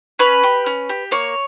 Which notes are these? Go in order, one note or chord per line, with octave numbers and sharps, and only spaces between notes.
C#4 B4
G4
C#4
G4
A#3 C#5